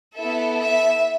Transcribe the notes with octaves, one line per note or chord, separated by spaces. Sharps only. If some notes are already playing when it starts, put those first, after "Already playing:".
B3 E4 A4 E5
E5